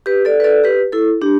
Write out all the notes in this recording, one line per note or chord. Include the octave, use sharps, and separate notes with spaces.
G4 B4
A4 D5
B4
A4 D5
G4 B4
E4 A4
D4 G4